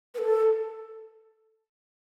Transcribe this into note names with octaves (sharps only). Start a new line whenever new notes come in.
B4
A4